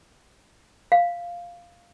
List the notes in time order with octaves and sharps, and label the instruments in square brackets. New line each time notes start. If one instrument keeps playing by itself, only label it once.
[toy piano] F5